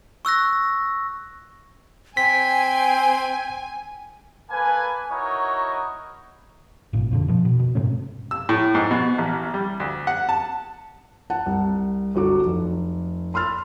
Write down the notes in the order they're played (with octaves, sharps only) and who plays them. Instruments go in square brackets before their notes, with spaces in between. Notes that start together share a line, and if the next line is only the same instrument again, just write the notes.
[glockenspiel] C#6 E6 F#6 A#6
[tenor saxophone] C4 [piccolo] G5 [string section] G#5 [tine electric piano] B6
[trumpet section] A#3 A4 B4 G#5
D#4 E4 F#4 A#4 C#5 D#5
[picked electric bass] G#1 A#2
F2 A#2 D3
B2 F3
B2
B2
G#2 C3 A3 C#4
[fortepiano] E6
A2
G#2
B2
A1
G3
D2
F#5
A5
[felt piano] F#5 A5
C2
G1 C2 F#3 F#4 A4 D6
F1
B5 C6 E6 F6 A6